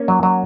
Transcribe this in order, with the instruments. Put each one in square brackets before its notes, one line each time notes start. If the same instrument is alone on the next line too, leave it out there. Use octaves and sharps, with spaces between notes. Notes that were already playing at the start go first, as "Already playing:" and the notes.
Already playing: [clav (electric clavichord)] A#3 C#4
F#3
F#3